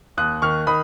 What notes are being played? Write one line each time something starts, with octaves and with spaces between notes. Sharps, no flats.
D#2 D#6 F#6
D#3 C#6 F6
D#3 B5 D#6